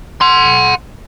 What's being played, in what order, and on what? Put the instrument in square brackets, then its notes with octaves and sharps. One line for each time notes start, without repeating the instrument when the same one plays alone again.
[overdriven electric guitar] F#5 C6